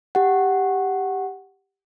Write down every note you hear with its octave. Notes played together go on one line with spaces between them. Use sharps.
G4 F#5